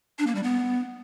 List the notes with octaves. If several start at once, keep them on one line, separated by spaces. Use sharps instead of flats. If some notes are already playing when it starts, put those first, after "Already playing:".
D4
A#3
G3
B3